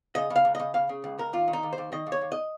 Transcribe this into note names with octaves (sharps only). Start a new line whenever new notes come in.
C#3 D#5
C#3
F5
C#2
C#3 D#5
C#3 F5
C#3
C#2
C#2 A#4
D#2 F4
D#3
D#4
D#2
C5
D#2
D#3 D#5
D#2
C#5
D#2
D#5